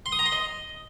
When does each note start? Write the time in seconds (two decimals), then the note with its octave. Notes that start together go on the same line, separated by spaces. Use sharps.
0.06 C6
0.12 D#6
0.19 A#5
0.26 C6
0.32 D#5